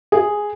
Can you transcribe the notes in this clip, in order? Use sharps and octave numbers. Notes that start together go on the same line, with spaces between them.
G#4